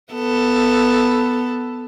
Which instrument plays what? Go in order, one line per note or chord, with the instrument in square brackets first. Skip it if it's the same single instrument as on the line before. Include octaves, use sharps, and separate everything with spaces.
[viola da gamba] B3 A4